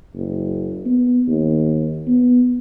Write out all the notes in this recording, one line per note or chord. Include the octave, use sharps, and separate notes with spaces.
F#1
B3
D#2
B3